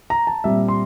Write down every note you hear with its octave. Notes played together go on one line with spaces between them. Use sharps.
A#5
A5
A#2 G3 C4 E5
C6